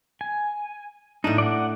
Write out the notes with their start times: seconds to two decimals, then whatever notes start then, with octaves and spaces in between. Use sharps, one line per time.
0.21 G#5
1.24 A2 D4 D#4
1.38 D5 F#5